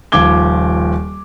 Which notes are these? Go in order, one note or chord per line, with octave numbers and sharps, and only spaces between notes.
D#1 F3 D6 G#6 G7